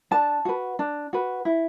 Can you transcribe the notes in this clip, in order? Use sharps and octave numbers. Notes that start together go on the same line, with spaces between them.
D4 A5
F#4 B4
D4
F#4 B4
E4